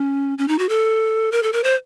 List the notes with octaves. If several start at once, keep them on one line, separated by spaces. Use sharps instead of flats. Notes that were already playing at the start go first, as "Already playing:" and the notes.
Already playing: C#4
C#4
D#4
F#4
A4
A#4
A4
A#4
C5